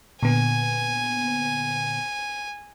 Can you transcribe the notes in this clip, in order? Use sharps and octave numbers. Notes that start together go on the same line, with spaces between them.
A#2 D3 B3 G#5